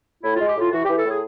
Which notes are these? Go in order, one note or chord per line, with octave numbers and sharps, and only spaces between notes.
A2 E4
F4
G#3
G4
A2 F4
E3 F#4
G4
E3
A4
A2 G#4